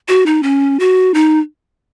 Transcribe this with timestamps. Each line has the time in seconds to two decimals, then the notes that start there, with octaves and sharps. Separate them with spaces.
0.09 F#4
0.26 D#4
0.43 C#4
0.80 F#4
1.14 D#4